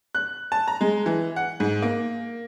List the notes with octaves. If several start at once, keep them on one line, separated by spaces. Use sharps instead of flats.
F#6
A5
A#5
G#3
E3
F#5
G#2
A#3